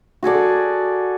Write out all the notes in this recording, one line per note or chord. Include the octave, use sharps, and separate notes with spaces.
F#4 G#4 A4 D5